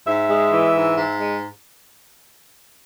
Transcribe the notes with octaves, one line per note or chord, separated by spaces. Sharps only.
G#2 E5
G#3
E3
G#2
G#2
G#3